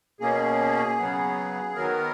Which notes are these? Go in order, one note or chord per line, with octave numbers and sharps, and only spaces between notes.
B2 A#3 C#4 G#4
C#3 F#3 B3
D#3 F#3 B3 A#4